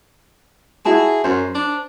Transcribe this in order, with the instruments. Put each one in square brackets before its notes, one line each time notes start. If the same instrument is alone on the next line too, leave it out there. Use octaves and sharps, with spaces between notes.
[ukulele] E4 F#4 A5 [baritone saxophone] G#4
[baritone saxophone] F#2 [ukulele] C5
[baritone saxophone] D4